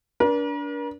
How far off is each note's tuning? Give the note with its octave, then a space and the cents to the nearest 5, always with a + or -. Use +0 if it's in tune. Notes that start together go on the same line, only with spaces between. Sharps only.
D4 -25 A#4 +45